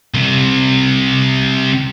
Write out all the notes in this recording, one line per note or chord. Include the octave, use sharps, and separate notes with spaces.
C2 C3